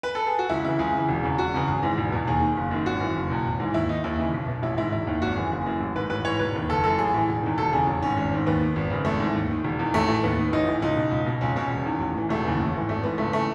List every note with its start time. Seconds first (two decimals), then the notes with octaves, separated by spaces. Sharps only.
0.03 B4
0.15 A4
0.27 G#4
0.39 F#4
0.49 C#2 E4
0.65 C#3 E3 E4
0.79 C#2 G#4
0.94 C#3 E3
1.08 E1
1.23 E2 C#3
1.38 E1 F#4
1.54 E2 C#3 E3
1.68 G#1 G#4
1.83 G#2 E3
1.98 E1
2.12 E2 B2
2.27 D#2 G#4
2.41 D#3
2.57 F#1
2.71 F#2 D#3
2.86 G#1 F#4
3.00 F#2 E3
3.16 F#1
3.30 E2 B2
3.45 G#1
3.60 G#2 E3
3.74 D#2 E4
3.89 D#3 D#4
4.04 D#2 E4
4.18 C#3 E3
4.34 B1
4.48 B2
4.62 A1 E4
4.77 G#2 D#3 E4
4.92 E1 E4
5.07 D#2 D#3
5.22 G#1 F#4
5.36 F#2 E3 G#4
5.51 F#1 G#4
5.66 F#2 E3
5.80 A1
5.96 G#2 D#3 B4
6.10 A1 B4
6.25 G#2 E3 C#5
6.39 E1 B4
6.55 D#2 D#3
6.69 F#1 A4
6.84 F#2 E3 A4
6.99 A1 G#4
7.14 A2 E3
7.28 E1
7.43 E2 D#3
7.58 E1 A4
7.73 E2 C#3 G#4
7.87 A1
8.02 G#2 D#3 C#4
8.17 G#1
8.32 G#2 D#3
8.46 D#2 B3
8.61 D#3
8.76 G#1
8.90 F#2 C#3
9.05 G#1 A3
9.20 G#2 E3
9.35 D#2
9.50 D#3
9.64 E1
9.79 E2 D#3
9.94 A1 A3
10.08 A2 E3
10.23 D#2 B3
10.39 D#3
10.53 A1 D#4
10.67 A2 E3
10.82 C#2 D#4
10.97 B2
11.11 C#2
11.26 B2
11.41 C#2 C#4
11.56 B2 C#4
11.71 E1
11.86 E2 D#3
12.00 A1
12.15 A2 E3
12.29 E1 A3
12.44 D#2 C#3 E3
12.60 A1
12.74 G#2 E3
12.89 G#1 A3
13.04 G#2 E3 B3
13.18 C#2 A3
13.33 C#3 E3 A3